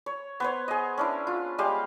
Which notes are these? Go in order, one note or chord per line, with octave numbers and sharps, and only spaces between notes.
C#5
B3 C5 C#5
G#4 D#5
C#4 D4 E4
F4
G3 G#3 G4 F5